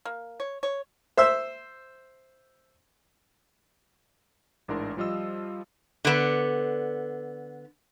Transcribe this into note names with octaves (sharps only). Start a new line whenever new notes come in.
A#3
C#5
C#5
C5 E5 E6
A1 G#2 D4 E4 A#4 C6
F3 G3 F4 D#5 E6
D3 B3